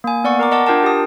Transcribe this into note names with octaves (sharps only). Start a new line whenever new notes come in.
A#3 G#5
B3 D5 F#5 C#6
A#4 A#5 D6
D#5 F#5 A5 D6
D4 F4 A#4 G5 A5
G4 D#6